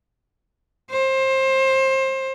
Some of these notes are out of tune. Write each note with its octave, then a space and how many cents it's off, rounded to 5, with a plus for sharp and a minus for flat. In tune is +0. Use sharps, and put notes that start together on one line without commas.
C5 +25